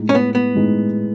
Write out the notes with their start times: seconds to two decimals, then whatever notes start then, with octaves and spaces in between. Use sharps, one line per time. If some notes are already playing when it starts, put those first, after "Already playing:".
Already playing: A2 G#3 D#4
0.09 C#4
0.15 B3
0.35 B3
0.55 A2 G#3 D#4